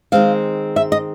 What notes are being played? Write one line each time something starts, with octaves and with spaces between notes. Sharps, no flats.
D#3 G#3 C4 F5
E5
D#5